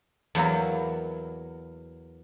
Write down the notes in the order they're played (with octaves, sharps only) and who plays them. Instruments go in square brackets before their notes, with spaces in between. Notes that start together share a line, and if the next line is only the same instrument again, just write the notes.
[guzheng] E2 F#3 A#3 E4